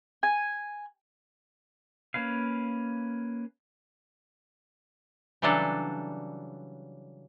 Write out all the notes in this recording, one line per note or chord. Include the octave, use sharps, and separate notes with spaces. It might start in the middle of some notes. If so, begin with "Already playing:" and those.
G#5
A#3 C#4 B4 F5
C#3 E3 F#3 G3 D4 A4